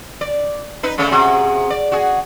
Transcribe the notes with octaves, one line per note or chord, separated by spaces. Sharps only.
D5
D#4 B4
C#3 A3 C#4
C3 F#4 G#4
D5
F#4 G#4